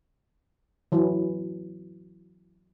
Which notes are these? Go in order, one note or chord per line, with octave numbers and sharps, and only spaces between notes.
E3 F#3